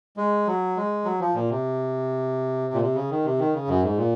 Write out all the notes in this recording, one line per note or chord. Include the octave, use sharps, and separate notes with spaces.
G#3
F#3
G#3
F#3
F3
A#2
C3
A#2
C3
C#3
D#3
C3
D#3
C#3
F#2
G#2
A#2